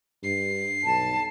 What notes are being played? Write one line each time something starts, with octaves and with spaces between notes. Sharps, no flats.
G2 C7
B1 A5